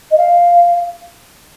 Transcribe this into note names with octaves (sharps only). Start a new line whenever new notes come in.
D#5
F5